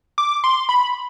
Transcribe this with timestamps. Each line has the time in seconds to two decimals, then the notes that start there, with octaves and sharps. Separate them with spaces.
0.18 D6
0.44 C6
0.69 B5